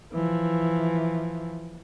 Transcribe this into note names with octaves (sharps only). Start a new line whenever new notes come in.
E3 F3